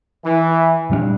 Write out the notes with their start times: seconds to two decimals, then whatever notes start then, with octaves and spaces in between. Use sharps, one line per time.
0.24 E3
0.90 A#2 G3 B3 D4